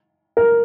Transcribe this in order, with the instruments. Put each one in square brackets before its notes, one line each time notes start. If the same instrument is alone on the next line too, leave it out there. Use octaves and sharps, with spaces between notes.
[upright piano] A#4